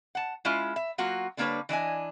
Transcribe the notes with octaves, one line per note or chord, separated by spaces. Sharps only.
F#5 A5
G#3 C#4 E4 F4
E5
F#3 A#3 F4 F#4
D3 G3 A#3 D4 B4 C#5
E3 D4 D#5 G#5